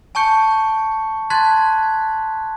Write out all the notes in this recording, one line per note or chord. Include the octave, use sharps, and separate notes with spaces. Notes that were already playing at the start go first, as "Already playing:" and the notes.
G#5 A5 C#6 G6 C#7
A5 C6 F#6 G#6 A6 B6